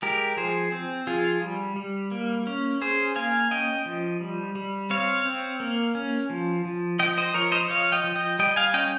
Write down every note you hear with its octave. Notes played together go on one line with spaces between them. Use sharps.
G#3 G4 A#4
F3 G#4 C5
C4
F3 F4 G#4
G3
G3
A#3
C#4
C#4 G#4 C5
A#3 F5 G#5
C#4 D#5 G5
F3
G3
G3
C4 C#5 F5
C4
A#3
C#4
F3
F3
F3 D#5 G5
C5 D#5
F3 A#4 C#5
C5 D#5
F3 C#5 F5
D#5 G5
F3
D#5 G5
G3 D#5 G5
F5 G#5
C#4 D#5 G5